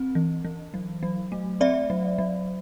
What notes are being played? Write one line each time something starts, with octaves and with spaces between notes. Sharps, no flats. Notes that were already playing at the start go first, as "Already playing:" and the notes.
Already playing: C4
E3
E3
F#3
F#3
A3
C4 D5 E5
F#3
F#3